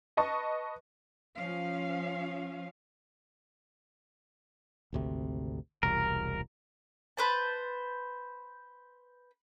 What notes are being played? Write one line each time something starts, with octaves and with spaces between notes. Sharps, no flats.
B4 D#5 A5 C#6
F3 C#4 F5
G#1 D2 C3
E1 C2 A#4
B4 C5 A5